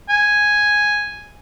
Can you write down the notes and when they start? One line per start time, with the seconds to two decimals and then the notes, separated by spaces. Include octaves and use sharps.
0.10 G#5